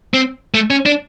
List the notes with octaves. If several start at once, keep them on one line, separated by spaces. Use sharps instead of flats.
C4
A3
C#4
D4